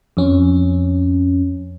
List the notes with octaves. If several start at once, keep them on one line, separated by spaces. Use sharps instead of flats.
F2 C#4